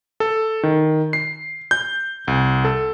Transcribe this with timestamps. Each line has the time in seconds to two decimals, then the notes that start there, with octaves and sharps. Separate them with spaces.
0.20 A4
0.63 D#3
1.13 C7
1.71 G6
2.28 C2
2.64 A4